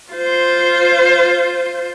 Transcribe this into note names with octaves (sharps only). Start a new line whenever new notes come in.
F4 C5